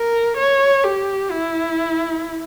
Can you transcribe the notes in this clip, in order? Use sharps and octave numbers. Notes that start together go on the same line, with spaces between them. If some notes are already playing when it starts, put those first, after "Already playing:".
Already playing: A#4
C#5
G4
E4